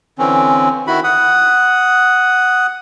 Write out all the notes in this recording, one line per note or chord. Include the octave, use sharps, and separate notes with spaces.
D3 E3 C4 C#4
D#3 E4 F#4 B5
F#5 D#6